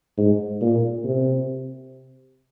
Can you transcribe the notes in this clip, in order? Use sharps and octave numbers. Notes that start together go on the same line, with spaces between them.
G#2
A#2
C3